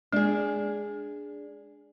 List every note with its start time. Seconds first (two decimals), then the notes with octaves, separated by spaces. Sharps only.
0.13 G#3 D4 G#4